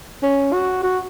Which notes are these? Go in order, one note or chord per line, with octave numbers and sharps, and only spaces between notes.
C#4
F#4
F#4